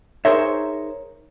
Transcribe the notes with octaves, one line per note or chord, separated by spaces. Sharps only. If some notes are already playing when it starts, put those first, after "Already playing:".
D#4 G#4 A#4 C5 C#5 E5